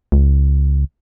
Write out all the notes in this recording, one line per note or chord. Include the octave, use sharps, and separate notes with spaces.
C#2